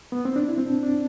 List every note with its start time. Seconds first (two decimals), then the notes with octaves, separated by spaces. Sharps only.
0.12 B3
0.25 C4
0.36 D4
0.48 E4
0.58 C4
0.66 D4
0.83 D4